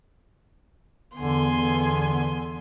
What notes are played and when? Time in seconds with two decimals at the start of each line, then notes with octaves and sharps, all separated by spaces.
1.16 E2 D3 B3 G#5 C6
1.57 D3